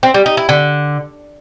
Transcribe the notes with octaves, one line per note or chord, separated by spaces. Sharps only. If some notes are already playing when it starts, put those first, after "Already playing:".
C4
G3
D#4
E4
D3